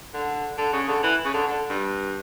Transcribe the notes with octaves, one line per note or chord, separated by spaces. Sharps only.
D3
D3
C#3
D3
E3
C#3
D3
D3
G2